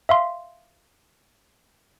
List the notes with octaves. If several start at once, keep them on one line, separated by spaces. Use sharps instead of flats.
E5 F5 C6